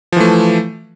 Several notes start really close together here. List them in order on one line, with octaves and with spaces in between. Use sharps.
F3 E3 A3